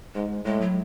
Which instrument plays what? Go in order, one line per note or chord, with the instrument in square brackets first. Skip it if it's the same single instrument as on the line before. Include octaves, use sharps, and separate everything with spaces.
[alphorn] G#2 [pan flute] G#3
[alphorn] A2 [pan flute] G#3
[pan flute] F#3